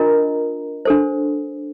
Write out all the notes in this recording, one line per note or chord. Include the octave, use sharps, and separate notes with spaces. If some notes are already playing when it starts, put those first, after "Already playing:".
Already playing: D4 F4 A#4 D#5 A#5
D4 A4 C5